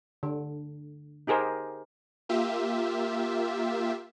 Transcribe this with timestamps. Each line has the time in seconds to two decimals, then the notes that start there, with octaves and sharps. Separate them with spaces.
0.23 D3
1.27 D#4 G4 G#4 A#4 C5
2.29 A#3 F4 G4 E5